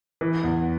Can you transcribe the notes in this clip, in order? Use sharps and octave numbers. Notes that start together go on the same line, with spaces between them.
E3
E2